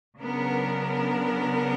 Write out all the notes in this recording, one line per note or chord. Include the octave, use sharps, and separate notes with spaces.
C#3 F#3 B3 D4 A#4